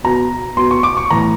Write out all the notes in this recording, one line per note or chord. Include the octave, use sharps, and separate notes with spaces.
B2 A#5
B2 C6
C#6
D6
C#6
A2 E3 A#5